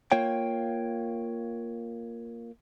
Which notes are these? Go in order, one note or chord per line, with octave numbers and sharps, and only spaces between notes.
A#3 F4 C#5 G5